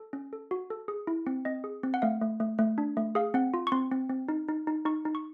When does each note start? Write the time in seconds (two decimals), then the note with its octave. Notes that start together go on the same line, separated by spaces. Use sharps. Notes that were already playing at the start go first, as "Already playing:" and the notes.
Already playing: A4
0.13 C#4
0.33 A4
0.51 F#4
0.70 A4
0.88 G#4
1.07 E4
1.27 C4
1.45 C4 D#5
1.64 G#4
1.83 C4
1.94 F#5
2.02 A3 F5
2.22 A3
2.40 A3
2.59 A3
2.78 D4
2.97 A3
3.15 G#4 F5
3.34 C4 F#5
3.54 F4
3.67 C#6
3.72 C4 C6
3.92 C4
4.10 C4
4.29 D#4
4.48 D#4
4.67 D#4
4.85 D#4 C#6
5.05 D#4
5.15 C#6